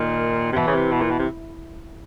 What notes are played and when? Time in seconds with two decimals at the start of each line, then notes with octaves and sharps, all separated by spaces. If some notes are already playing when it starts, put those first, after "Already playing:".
Already playing: A#2 D#3
0.52 C3
0.56 B2 E3
0.67 C#3
0.74 C3
0.92 B2
1.01 A#2
1.10 B2
1.19 C3